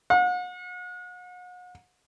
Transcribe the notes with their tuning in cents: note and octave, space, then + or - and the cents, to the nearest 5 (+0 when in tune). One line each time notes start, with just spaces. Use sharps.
F#5 -40